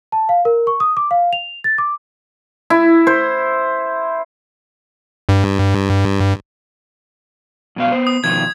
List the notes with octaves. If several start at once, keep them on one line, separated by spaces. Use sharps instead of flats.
A5
F5
A#4
C#6
D#6
D6
F5
F7
A6
D6
E4
C5
G2
F#2 B2 F5
B3 C5
D#6
B2 D#3 F3 G#6